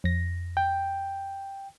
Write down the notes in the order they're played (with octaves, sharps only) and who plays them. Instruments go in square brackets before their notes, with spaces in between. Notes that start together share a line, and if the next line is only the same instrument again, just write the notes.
[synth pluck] F2 A#6
[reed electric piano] G5